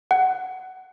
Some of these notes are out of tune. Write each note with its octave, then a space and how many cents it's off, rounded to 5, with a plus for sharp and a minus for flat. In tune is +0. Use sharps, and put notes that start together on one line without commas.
F#5 +15